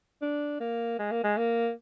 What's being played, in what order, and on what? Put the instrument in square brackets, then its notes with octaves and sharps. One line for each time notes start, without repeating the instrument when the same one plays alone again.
[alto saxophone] D4
A#3
G#3
A#3
G#3
A#3